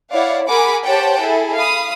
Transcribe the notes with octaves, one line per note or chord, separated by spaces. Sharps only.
E4 C#5 D5 F5 F#5
G#4 A#4 F#5 G#5 B5 D6
G4 C5 C#5 F#5 G5 A5
E4 G#4 A4
F5 B5 D#6